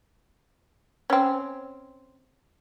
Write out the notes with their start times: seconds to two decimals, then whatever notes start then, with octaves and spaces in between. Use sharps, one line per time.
1.10 C4 C#4